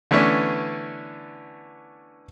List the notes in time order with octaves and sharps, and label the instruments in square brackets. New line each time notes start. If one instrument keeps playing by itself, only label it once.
[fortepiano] D3 E3 A3 B3 C#4 D4